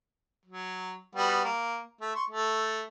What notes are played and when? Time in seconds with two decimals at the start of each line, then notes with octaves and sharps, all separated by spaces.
0.46 F#3
1.15 G3 B3 F#4
1.44 A#3
2.01 A3
2.15 C6 C#6
2.30 A3